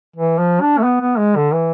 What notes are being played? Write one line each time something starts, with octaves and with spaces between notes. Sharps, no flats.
E3
F3
D4
A3
B3
B3
G#3
D3
E3